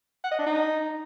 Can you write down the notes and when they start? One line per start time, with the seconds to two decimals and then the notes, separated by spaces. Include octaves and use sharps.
0.24 F#5
0.31 D#5
0.39 D4
0.46 D#4